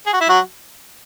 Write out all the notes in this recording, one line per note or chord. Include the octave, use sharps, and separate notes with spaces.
G#4
F#4
E4
F#3 F#4